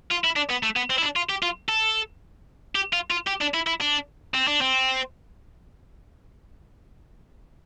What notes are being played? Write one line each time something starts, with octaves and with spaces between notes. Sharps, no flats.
F4
E4
D4
B3
A3
B3
C4
E4
D4
F4
G4
F4
A4
G4
F4
F4
G4
D4
E4
E4
D4
C4
D4
C4